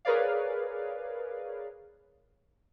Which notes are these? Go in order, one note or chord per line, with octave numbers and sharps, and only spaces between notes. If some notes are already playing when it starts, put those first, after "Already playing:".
G#4 A#4 B4 C#5 D5 F5